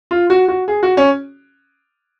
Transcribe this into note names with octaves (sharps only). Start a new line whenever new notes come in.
F4
F#4
F#4
G#4
F#4
C#4